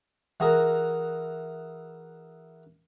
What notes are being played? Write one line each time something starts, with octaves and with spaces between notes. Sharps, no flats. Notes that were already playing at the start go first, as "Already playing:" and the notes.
E3 F#4 G#4 A#4